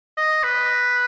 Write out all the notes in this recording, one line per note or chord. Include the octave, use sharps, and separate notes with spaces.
D#5
B4